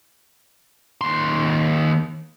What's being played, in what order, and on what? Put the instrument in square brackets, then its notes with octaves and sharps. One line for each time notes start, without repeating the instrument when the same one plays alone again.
[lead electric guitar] D#2 C6